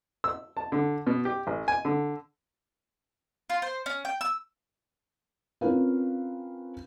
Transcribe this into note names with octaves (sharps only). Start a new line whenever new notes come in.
E6
A5
D3
B2
G4
A1
G#5
D3
F4
C5
C#4
G5
E6
C4 C#4 F4 A#4 B4 F5